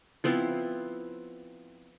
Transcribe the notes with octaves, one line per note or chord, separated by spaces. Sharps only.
F3 B3 C4 E4